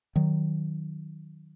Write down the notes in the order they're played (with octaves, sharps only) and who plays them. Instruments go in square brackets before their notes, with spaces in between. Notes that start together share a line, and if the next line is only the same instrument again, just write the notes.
[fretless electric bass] D#3 F#3